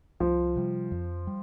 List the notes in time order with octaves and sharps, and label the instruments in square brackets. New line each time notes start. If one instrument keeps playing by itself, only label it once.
[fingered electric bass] C2 [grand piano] F3
[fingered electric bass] C3 G3
F2
G3